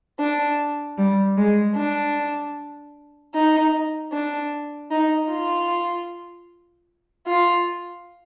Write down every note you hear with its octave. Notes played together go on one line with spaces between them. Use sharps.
D4
G3
G#3
D4
D#4
D4
D#4
F4
F4